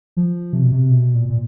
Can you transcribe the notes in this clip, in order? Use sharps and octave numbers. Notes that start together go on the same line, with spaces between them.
F3
C3
B2
C3
B2
A#2
A#2